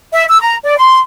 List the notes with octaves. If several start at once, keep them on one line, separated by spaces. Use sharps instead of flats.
E5
E6
A#5
D5
C6